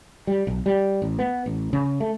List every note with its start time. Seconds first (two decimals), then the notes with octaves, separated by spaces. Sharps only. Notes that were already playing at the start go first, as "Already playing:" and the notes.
0.27 G3
0.47 B1
0.66 G3
1.02 A1
1.19 B3
1.46 A1
1.73 C#3
2.00 A3